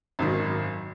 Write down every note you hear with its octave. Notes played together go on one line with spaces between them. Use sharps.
G#1 F#2 D#3